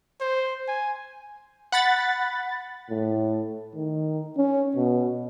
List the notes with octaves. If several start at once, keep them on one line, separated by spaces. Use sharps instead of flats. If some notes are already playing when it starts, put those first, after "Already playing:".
C5
G#5
F#5 B5 A6
A2
D#3
C#4
B2